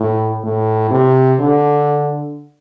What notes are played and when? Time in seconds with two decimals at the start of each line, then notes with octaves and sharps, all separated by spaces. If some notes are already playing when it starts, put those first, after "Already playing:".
Already playing: A2
0.43 A2
0.91 C3
1.39 D3